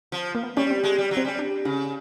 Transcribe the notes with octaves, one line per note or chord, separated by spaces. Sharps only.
F3
A#3
B3
G3 C#4
C4
G#3
G3
F#3
C4
G3 C#4
D4
C#3 C#4